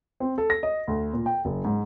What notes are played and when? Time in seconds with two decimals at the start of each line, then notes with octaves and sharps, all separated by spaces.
0.20 C4
0.38 A4
0.50 A#6
0.63 D#5
0.88 D2
1.13 A#2
1.26 G5
1.45 F#1
1.65 G#2